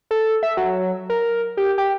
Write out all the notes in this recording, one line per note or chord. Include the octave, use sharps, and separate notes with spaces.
A4
E5
F#3
A#4
G4
G4